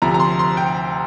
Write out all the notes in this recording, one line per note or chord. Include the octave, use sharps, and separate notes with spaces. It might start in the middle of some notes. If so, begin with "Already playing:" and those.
D2 C3 F3 A#5
A#5
C6
C6
G5